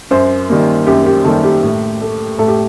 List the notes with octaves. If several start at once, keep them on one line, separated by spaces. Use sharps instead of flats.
F#2 C5
D#3 G3 A#3
F#2 G4
G4
D#3 G3 A#3 A4
G4
A2
A3
A2 A4
G4